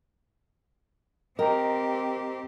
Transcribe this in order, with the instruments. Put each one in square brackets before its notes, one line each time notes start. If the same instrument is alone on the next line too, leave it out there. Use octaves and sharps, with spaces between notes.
[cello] C4 G4 [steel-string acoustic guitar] A#4 [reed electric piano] D#5 G5 A#5